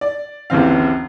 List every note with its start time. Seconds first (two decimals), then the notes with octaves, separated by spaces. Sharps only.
0.01 D5
0.50 G1 D#2 C#3 E3 C4 F5